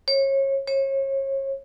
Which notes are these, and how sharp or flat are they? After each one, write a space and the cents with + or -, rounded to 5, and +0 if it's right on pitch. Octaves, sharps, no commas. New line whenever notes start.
C#5 -30
C#5 -35